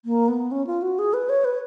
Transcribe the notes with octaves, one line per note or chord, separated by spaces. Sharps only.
A#3
B3
C#4
F4
F#4
G#4
B4
C#5
B4